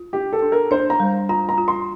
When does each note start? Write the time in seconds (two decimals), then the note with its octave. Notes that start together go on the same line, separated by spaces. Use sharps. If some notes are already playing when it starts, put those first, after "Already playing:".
Already playing: F4
0.13 D4 G4
0.33 A4
0.42 D4
0.52 A#4
0.71 D4 C5
0.90 A#5
1.00 G3
1.29 F4 A#5
1.49 A#5
1.58 F4
1.68 C6